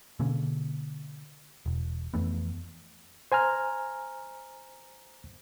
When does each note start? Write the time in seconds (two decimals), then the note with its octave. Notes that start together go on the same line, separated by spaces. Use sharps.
0.20 B2 D3 A#3 C#4
1.66 E1
2.14 F2 E3 A3 B3
3.32 C5 G#5 A#5 F6